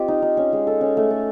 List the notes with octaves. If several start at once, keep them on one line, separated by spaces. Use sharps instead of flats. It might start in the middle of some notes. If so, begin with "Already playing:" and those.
Already playing: C4 F4 G4 D#5
D#4
D#4
C#4
G#3
A4
C#4
A3
A4